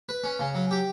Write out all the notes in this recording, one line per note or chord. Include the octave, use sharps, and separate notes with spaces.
B4
C#4
C#3
F#3
G4